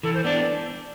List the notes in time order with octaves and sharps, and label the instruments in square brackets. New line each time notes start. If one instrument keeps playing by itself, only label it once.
[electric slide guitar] E3 [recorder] A4
[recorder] C5
[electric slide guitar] B3 D4 [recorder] D5